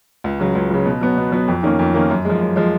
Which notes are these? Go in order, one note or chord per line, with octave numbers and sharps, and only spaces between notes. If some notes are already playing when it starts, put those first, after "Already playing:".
C#2
C#3 F#3
C#2
C#3 F#3
B2
F#3 B3
B2
F#3 B3
F2
D#3 A#3 C#4
F2
D#3 A#3 C#4
F#2
F3 G#3
F#2
F3 G#3